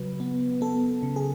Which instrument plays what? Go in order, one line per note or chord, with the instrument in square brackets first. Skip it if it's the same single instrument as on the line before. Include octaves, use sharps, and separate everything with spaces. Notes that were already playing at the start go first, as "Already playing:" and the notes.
Already playing: [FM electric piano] C#3 F#3 B4
B3
B3 A4
C#3
G#4